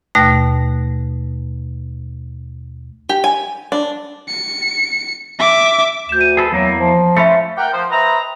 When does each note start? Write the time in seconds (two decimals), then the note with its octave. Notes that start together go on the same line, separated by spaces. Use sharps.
0.15 D#2 B2 A3 F#6 A#6
3.09 G4
3.24 G#5
3.72 D4
4.28 C#7
5.39 E5 D6
6.09 D2 G6 E7
6.21 D#7
6.37 G#4 A4 B4
6.52 E2 F#3 A#3 E4
6.79 F3
7.17 A3 C#4 F4 E5 B5 C#7
7.57 A#4 F#5 G5
7.73 F3 C5
7.90 B4 C5 D#5 E5 G5 A#5